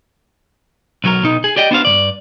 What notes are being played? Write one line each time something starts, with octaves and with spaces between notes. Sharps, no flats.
B1 F#3 A#4
B2 D#4
G#4
G4 D5 D#5 G5
B3 D4 F#4 C5 D5 F5
G2 C3 D5